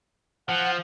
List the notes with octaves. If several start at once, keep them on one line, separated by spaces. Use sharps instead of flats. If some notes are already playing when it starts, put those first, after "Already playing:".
F3 F#5